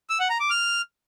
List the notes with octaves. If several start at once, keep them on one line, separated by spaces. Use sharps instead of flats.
E6
F#5
A#5
D6
F6